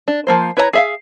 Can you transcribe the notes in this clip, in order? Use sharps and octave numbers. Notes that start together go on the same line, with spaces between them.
D4
F3 A#3 C5
E4 B4 C#5 D#5 A#5
G#4 E5 F5